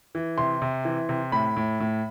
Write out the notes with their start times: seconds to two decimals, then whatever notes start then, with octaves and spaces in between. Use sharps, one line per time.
0.15 E3
0.38 C3 C6
0.62 C3
0.85 E3
1.09 C3
1.32 A2 B5
1.56 A2
1.80 A2